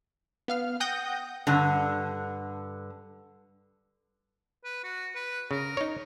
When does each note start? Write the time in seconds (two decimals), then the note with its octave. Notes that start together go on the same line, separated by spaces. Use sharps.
0.48 B3 F5 F6
0.80 F#5 G5 D#6 G6 A#6
1.47 G2 D3
4.64 B4
4.84 F#4
5.15 B4
5.51 C#3 A#4
5.77 D#4 C#5